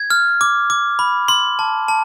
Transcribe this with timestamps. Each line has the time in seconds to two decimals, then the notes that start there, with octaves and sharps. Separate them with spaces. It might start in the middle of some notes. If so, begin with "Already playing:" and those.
Already playing: G#6
0.10 F6
0.41 D6
0.70 D6
0.99 B5
1.28 C6
1.59 A5
1.88 A5